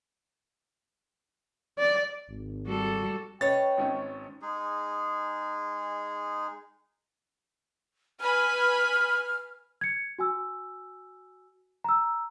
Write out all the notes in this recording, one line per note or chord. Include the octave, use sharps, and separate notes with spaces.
D5
G#1
G3 F#4 A4
C#4 B4 C#5 D#5 G5 A6
G#1 G#2 C#4
G#3 D#4 G#4
B4 G#5 B5 F6
G#6 C#7
F#4 G#5 E6
A#5 E6